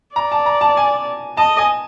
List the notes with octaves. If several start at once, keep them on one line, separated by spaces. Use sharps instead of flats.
D5 A#5
A5
A#5
A5
G#5
D#5 A5
G#5